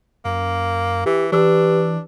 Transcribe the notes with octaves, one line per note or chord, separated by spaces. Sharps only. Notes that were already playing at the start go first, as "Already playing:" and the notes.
F#2 A#3
E3 G4
E3 D4 G4 B4 E6